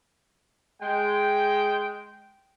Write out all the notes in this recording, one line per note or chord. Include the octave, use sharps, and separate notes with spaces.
G#3 G5